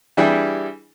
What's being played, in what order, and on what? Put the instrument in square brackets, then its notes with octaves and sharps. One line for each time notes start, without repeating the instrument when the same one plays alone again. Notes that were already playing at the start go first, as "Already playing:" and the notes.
[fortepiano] E3 G3 D4 E4 G4 G#4